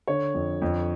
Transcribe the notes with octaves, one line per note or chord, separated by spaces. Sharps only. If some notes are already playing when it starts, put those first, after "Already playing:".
D3 C#5
F2
F2